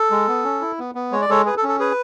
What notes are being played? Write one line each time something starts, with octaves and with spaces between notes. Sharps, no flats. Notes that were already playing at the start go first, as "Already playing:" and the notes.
Already playing: A4
G#3
B3
C#4
E4
B3
B3
G#3 C#5
D5
G#3 A4 C#5
G#4 B4
A4
C#4
A4
G#4 B4